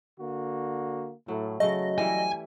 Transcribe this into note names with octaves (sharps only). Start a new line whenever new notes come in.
D3 A#3 F#4
A2 F#3
C#3 F#3 A3 D#5
E3 G3 E4 G#5